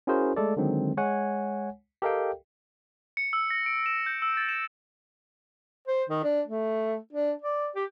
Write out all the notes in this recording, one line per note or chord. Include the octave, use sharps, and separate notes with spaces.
C#4 E4 F#4 G#4 A#4 C5
G#3 A3 A4 D5
D3 D#3 F#3 G#3 C4
G#3 C#5 F#5 G#5
G4 A4 A#4 D#5 F5 G5
C#7
E6
A#6
D7
E7
G6
E6
A6
E7
C5
D#3
D4
A3
D4
D5
G4